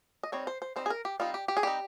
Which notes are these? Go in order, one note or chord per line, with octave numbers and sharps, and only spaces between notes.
D#5
G3 C4 D#4 C#5
C5
C5
G3 C4 D#4 C5
G#4
A#4
G4
G3 C4 D#4 F4
G4
G4
G#4
G3 C4 D#4 G4